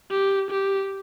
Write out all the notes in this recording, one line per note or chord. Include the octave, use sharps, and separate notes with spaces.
G4
G4